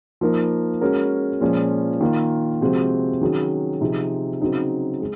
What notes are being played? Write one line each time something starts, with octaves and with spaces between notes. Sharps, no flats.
F3 A#3 D#4 A#4
G#3 C#4 F#4 A#4
A#2 F3 G#3 C#4
D#3 A#3 F4 A#4
C3 F3 G#3 C4 F#4
D#3 F#3 C#4 G#4
C3 F3 C4 D#4 G#4
C#3 F#3 C4 D#4
G#3